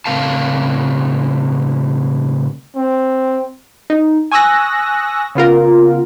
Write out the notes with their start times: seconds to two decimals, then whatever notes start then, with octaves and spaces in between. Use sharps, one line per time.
0.06 A2 C#3 C4 A#4 F5 A5
2.76 C4
3.90 D#4
4.31 G#5 C#6 D#6 E6 F#6 A#6
5.35 C#3 B3 F4 A#4